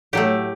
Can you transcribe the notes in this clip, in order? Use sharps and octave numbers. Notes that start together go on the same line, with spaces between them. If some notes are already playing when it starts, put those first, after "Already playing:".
A2 F#3 A3 G4